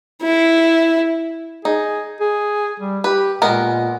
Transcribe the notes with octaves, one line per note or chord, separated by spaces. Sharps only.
E4
D#4 G#4
G#4
G3
G4 B4
A#2 G#3 B3 A#4